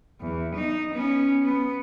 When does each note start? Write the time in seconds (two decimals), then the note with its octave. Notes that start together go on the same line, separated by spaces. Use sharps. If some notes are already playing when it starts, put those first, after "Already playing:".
0.21 E2
0.55 D#4
0.94 B3 C#4
1.43 B3